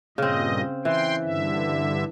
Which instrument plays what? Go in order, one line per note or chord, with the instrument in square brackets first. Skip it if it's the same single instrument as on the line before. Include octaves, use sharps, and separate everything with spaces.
[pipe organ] G2 A#2 D#5 [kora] C#3 C4
[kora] E3 [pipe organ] G5 C6
[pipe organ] G2 D3 E5